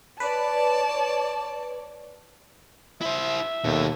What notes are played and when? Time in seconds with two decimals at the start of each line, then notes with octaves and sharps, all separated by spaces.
0.20 B4 C#5 D5 A5
3.01 E4 C5 E5
3.64 D#2 B2 A4